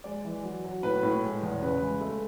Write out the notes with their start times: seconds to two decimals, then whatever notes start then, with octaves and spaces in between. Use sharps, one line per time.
0.04 G#3 D5
0.25 E3
0.43 F#3
0.64 F#3
0.83 A2 B4
1.03 A2
1.23 G#3
1.43 E2
1.62 C#3 B4
1.82 G#3
2.01 A3